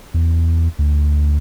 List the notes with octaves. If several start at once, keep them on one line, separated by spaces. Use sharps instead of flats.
E2
D2